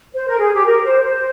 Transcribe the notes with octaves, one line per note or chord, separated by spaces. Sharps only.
C5
A#4
G#4
G4
A#4
C5
C5